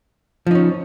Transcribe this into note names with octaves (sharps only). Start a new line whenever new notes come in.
F3 C#4 D#4